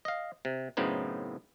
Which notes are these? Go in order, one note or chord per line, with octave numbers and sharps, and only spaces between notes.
D#5 F5
C3
F#2 A2 C#3 B3 C4 D#4